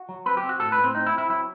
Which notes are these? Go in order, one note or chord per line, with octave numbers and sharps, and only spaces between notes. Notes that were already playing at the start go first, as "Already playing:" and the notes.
Already playing: F#4
F#3
C4 B4
G4
C4
F#4
A2 A4
B4
A2
C4
C4 D#4
E4
C4
E4
F#3 E4